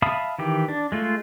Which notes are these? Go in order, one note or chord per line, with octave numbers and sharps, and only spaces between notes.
E5 F5 A5 B5 D#6
D#3 E3 G4
D4
G#3 A3 F4